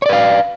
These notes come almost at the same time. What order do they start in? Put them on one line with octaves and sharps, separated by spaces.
C#5 D5 B4 F5